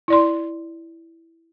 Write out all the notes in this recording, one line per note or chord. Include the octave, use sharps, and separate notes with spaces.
E4 D5 C6